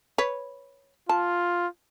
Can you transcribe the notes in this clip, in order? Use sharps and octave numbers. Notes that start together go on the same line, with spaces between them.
B4 C#5
F4 A5